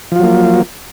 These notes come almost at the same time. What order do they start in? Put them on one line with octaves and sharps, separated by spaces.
F3 F4 F#3 A#3